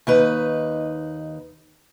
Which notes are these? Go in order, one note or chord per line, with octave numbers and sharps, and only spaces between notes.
D#2 D#4 B4